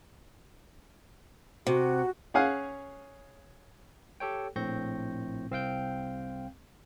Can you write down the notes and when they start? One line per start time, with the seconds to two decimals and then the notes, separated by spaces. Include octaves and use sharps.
1.67 C3 F#4
2.34 C#4 G#4 F5 F#5 G#5
4.20 G4 A4 C#5 G5
4.56 A#1 A2 C4 C#6 G6 A#6
5.51 C2 C4 F5 G5 G6